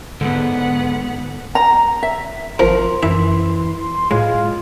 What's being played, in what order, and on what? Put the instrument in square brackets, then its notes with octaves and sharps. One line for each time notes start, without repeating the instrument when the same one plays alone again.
[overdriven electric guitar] G#2 [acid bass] D3 [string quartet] B3 F#5
[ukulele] A#5
E5
[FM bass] G#1 [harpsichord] F3 [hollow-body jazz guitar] A#4 [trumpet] C6
[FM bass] F#2 [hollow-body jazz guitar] E3 [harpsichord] E5
[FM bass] A2 [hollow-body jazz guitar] G#3 [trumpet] F4